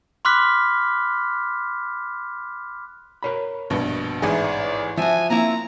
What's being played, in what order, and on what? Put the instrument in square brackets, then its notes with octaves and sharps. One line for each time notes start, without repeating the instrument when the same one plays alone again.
[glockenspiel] B5 C6 D6 F6 F#6 B6
[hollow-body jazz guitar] A#4 C#5 B5
[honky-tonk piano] A#1 G2 B2
[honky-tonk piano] A1 G#2 G#4 [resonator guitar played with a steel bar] E3 D#4 [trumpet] D5
[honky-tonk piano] F3 [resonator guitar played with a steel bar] F#4 E5 [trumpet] G#5
[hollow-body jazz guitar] A#3 [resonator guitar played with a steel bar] C4 C#4 E4 [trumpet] A#5